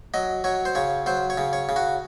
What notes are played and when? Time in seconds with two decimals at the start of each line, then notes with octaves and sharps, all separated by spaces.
0.14 F#3 D#5
0.44 F#3 C#5
0.65 C5
0.75 C#3 C#5
1.06 F#3 C5
1.30 C#5
1.38 C#3
1.53 C#5
1.69 C#3
1.76 F#4